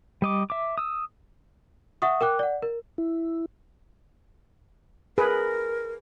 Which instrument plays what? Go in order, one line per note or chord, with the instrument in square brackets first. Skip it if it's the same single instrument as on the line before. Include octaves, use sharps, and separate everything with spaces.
[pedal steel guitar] G3 D#5 D6
E5 D6
D#6 E6
[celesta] E5 F#5 C#6 D#6
A#4 G5 D6 F#6
D5 F#5
A#4
[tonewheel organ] E4
[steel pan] G#4 B4 [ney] A#4